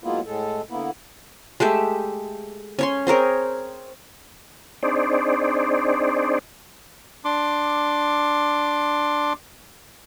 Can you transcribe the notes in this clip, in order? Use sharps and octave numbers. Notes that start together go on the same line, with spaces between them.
F#3 G#3 A#3 B3 E4 F4
A2 G#3 A4
D3 A#3 B3 E4
G#3 A3 G4 E5
C#4 C#5 C6
C4 G#4 A#4 C#5
C4 D4 D#4 G#4 C5 D5
D4 C6 D6